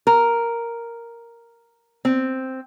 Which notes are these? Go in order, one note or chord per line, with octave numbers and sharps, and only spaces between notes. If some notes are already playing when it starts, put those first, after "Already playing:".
A#4
C4